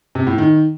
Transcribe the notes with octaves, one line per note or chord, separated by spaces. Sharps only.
C3
A2
D#3